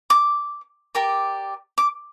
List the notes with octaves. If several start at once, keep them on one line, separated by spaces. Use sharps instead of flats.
D6
G4 A#4 D5
D6